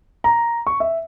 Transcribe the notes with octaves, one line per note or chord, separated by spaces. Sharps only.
A#5
C#6
E5